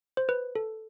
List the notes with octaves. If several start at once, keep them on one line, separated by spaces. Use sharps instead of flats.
C5
B4
A4